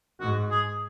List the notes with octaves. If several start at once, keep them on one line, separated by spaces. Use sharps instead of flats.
G#2 F#4
G#4